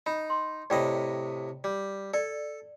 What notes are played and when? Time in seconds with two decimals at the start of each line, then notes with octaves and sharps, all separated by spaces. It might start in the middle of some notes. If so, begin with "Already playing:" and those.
0.06 D#4 B5
0.30 C6
0.70 A2 C3 D5 D#5 G5 B5
1.64 G3
2.14 A4 D5